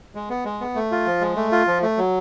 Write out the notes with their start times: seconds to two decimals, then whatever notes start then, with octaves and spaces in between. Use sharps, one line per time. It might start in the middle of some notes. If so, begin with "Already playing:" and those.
0.15 G#3
0.30 B3
0.45 G#3
0.61 B3
0.75 A3
0.91 F4
1.06 F3
1.21 G#3
1.36 A3
1.52 F4
1.67 F3
1.82 A3
1.97 F#3